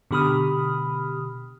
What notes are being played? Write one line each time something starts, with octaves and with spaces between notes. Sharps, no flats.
B2 D3 G4 B5 D#6 F6